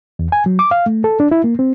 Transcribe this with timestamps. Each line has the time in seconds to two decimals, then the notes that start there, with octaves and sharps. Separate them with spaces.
0.19 E2
0.32 G#5
0.46 F#3
0.59 D6
0.71 F5
0.86 A3
1.04 A4
1.20 D4
1.31 E4
1.44 A#3
1.59 C4